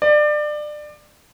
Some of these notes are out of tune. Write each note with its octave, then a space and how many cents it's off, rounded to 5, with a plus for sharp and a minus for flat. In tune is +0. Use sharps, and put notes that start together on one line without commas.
D5 +25